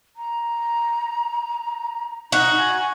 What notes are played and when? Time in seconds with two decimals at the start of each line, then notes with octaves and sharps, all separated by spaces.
0.16 A#5
2.32 D#4 F#4
2.57 G#5